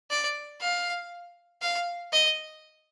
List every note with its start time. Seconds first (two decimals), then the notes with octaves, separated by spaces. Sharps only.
0.10 D5
0.61 F5
1.62 F5
2.13 D#5